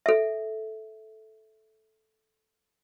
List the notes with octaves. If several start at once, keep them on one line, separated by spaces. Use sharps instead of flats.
A4 E5